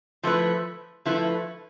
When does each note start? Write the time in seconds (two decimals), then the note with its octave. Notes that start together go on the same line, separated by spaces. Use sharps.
0.23 F3 A3 E4 B4
1.05 F3 A3 E4 B4